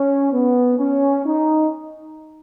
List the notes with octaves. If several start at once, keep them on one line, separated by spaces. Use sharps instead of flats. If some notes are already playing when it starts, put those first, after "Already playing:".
Already playing: C#4
B3
C#4
D#4